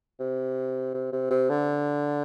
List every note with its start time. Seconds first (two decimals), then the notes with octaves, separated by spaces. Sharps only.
0.19 C3
0.94 C3
1.12 C3
1.30 C3
1.50 D3